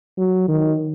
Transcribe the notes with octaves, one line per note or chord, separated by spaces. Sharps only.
F#3
D#3